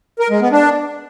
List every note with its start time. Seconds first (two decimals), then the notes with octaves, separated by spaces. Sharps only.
0.19 A#4
0.30 G#3
0.41 B3
0.52 D4